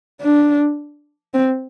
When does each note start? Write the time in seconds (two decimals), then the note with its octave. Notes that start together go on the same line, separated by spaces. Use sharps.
0.21 D4
1.34 C4